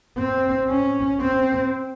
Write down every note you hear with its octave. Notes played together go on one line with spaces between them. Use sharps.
C4
C#4
C4